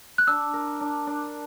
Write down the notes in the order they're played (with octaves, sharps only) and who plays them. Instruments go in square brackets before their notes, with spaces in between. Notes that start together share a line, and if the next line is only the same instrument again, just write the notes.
[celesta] F#6
[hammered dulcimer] D4 [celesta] E6
[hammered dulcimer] A#4
D4
D4